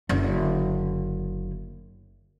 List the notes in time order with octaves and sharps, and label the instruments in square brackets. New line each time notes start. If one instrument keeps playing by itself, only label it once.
[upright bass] F#1 D3